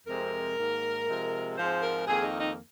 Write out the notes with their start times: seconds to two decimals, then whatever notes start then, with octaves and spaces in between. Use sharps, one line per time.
0.07 F2 C3 G#3 C4 A#4
0.57 G#2 D#3 A#3
1.07 C3 F3 G#3
1.57 G#2 F3 G#3 C4 C5
1.82 A#4
2.07 F2 D#3 A#3 G#4
2.24 D#4
2.40 D#4